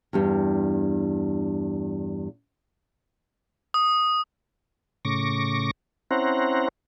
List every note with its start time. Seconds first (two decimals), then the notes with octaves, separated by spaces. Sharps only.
0.13 E2 G2 G3
3.74 D#6
5.05 A2 C#3 C#6 D6 A#6
6.11 C4 C#4 E4 C5 F#5 A#5